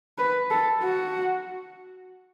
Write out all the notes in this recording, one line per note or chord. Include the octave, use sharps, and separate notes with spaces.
B4
A4
F#4